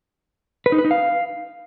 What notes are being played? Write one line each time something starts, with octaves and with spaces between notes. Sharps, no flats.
B4
D#4
B4
D#4
F5